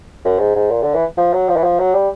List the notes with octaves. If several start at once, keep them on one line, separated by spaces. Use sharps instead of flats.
F#2
G#2
G#2
A#2
D3
E3
F3
F#3
F3
E3
F3
F#3
G3